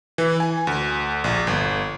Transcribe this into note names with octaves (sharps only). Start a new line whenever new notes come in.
E3
G#5
D2
A#1
G1